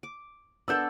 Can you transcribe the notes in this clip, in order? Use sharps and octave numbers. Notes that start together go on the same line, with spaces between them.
D6
B3 D4 A4 E6 G6